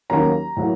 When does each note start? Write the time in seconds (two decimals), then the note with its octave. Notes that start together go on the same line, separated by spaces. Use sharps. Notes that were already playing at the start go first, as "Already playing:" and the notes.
0.10 D#2 D#3 F#3 A#3 C#4 A#5
0.57 A2 F#3 A#3